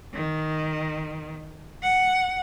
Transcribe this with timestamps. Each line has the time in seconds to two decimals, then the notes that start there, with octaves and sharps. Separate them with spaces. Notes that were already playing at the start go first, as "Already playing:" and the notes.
0.14 D#3
1.83 F#5